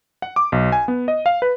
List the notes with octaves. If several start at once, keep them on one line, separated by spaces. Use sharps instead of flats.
F#5
D6
B1
G#5
B3
D#5
F5
B4